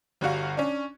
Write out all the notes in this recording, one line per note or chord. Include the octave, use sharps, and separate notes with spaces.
G1 G3 F#4 F5
C#4 D4